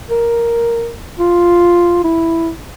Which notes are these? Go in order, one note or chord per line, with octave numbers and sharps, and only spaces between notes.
A#4
F4
E4